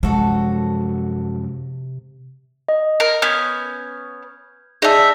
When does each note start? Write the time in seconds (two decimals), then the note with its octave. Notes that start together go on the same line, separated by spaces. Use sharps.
0.03 F#2 C3 F3 G#3 F#4 A4
2.69 D#5
3.00 A#4
3.22 B3 C#4 F6 G6 G#6
4.82 D#4 G#4 D5 E5 A5